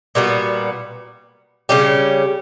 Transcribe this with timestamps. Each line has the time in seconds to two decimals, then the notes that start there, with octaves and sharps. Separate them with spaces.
0.15 A#2 G3 B3 F#4
1.69 C#3 G3 C#4 G4